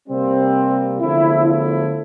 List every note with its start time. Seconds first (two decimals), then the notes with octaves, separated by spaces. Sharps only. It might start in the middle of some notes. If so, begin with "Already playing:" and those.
0.08 C3 G3 A#3 C4
1.01 E2 D3 F3 A3 E4
1.47 E4